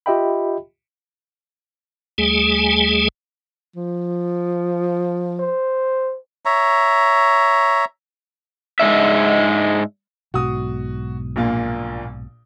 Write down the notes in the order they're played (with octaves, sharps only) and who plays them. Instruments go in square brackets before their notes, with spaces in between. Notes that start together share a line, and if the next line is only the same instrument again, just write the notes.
[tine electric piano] F4 G4 D#5 E5 G5 B5
[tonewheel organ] D#2 G3 A3 G#4 G#5
[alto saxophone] F3
[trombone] C5
[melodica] C#5 E5 A#5
[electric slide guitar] G#2 E3 G#3 D4 E5
[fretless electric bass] B1 G#2 B2 [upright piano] F#4 D#6
[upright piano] A#1 A#2 A#3